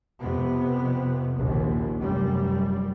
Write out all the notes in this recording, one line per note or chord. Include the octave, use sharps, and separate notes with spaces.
F2 C3 B3
A#1 D#2
F1 F#2 G3